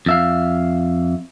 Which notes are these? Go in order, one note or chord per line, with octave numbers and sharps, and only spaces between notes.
F2 E5 F5